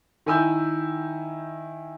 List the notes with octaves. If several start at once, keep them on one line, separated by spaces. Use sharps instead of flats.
D#3 E4 G#5 B5 E6 G6